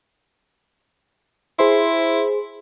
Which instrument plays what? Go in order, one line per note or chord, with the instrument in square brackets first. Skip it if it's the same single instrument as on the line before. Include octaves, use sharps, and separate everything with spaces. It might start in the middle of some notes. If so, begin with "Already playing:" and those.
[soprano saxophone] E4 [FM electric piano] G#4 C5 C6